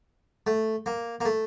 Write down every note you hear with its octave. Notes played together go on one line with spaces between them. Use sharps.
A3
A#3
A#3
A3